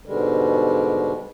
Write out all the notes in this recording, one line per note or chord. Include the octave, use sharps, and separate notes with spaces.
G#2 B2 D3 G3 G#3